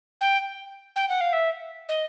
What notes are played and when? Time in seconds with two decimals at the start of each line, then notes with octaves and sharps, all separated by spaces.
0.21 G5
0.95 G5
1.09 F#5
1.20 F5
1.32 E5
1.88 D#5